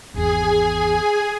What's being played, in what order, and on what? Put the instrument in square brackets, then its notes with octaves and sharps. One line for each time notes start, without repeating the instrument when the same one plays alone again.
[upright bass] G#1 E2 [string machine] G#4 G#5